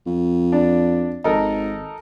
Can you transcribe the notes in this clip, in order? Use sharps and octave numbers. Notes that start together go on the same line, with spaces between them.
F2
D4
G#1 D#4 A4 A#4